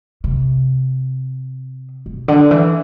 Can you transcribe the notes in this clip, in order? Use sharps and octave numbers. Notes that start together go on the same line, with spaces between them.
C3
B2
D3
E3